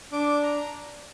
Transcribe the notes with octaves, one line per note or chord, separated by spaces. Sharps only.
D4 D6
A#5